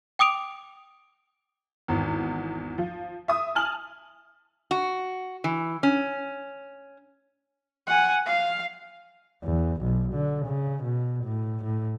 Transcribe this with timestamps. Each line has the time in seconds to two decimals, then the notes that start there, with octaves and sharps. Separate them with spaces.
0.19 G5 D6 D#6 D7 F7
1.88 G#1 E2
2.78 F3
3.28 E5 D#6
3.55 G#5 A5 F6 F#7
4.71 F#4
5.44 E3
5.83 C#4
7.87 F#5 G#5
8.26 F5
9.44 E2
9.82 B1
10.14 D3
10.46 C#3
10.83 B2
11.24 A2
11.64 A2